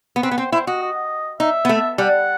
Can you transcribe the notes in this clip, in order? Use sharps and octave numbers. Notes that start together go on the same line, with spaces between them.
B3
C4 B4
B3
C4 C5
E4 C5
F#4 D#5
D#5
D#4 E5
B3
A3
G3 F#5